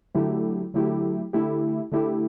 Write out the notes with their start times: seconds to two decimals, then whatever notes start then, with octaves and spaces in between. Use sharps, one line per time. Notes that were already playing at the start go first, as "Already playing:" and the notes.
0.15 D3 F#3 A3 E4 G4
0.74 D3 F#3 A3 E4 G4
1.33 D3 A3 E4 G4
1.92 D3 A3 E4 G4